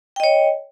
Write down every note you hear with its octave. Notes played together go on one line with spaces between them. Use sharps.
C#5 D#5 G5